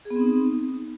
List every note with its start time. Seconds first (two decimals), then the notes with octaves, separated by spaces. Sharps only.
0.05 G#4
0.10 B3
0.16 C4
0.21 D#4